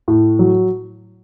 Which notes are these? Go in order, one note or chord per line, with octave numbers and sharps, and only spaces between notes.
A2
F#3